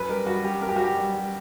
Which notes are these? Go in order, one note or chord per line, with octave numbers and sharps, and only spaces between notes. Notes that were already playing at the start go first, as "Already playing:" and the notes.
Already playing: F#2 B4
G3 A#4
G3 F#4
G3 G4
F#2 A#4
G4
F#4
G3 G4
G3
G3